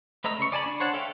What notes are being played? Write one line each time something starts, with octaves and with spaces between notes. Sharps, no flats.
A3 B4 D#5 A#5 E6
C#3 C#6
D5 G#5 A5 B5
D4
C5 C#5 F#5 A5
A4 B4 E5 F5 G5